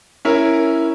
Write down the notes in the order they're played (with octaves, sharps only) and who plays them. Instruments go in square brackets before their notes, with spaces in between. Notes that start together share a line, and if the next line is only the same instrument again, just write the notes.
[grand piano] C#4 E4 A#4